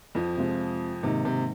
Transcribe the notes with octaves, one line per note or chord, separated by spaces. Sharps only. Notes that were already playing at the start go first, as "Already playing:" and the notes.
F2 F3
C3 G#3 C4 F4
G#2 C3 D#3 A#3 D#4
C3